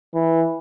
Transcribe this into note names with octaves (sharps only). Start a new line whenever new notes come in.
E3